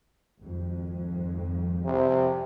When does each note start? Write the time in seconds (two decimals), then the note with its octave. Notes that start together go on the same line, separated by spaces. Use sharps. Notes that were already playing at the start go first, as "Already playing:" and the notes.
0.40 G#1 F2
1.85 C3